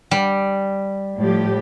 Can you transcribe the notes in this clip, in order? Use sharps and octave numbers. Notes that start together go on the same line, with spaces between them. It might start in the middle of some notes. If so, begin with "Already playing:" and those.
G3
A2 F3 G4